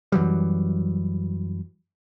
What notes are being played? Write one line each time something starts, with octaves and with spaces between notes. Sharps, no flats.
F#2 E3 F#3 G3